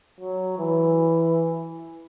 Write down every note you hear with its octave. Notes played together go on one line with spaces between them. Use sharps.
F#3
E3